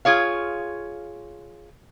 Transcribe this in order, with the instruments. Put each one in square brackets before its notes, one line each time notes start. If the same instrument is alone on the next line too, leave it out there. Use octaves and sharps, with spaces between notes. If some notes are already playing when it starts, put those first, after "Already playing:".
[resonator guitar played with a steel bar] F4 G#4 C#5 F5